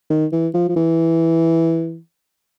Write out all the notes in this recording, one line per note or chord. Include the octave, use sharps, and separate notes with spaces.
D#3
E3
F3
F3
E3